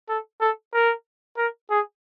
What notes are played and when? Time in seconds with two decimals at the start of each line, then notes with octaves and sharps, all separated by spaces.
0.09 A4
0.41 A4
0.74 A#4
1.37 A#4
1.70 G#4